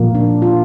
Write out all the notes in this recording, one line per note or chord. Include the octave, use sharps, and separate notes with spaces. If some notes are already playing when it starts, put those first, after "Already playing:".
Already playing: A#2 F3 A#3
D4
F4